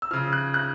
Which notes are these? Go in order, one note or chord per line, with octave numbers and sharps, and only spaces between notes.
E6
C#3 F3 F6
F#6
F#6